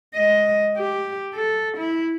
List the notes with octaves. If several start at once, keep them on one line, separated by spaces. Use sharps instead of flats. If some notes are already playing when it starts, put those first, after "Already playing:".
G#3 D#5
G4
A4
E4